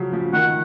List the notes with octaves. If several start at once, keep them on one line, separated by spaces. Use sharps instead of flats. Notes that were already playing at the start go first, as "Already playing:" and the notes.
Already playing: C#3 F3 F#3
F3
D#3 F#5